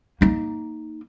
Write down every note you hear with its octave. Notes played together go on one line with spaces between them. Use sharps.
A#3 D#4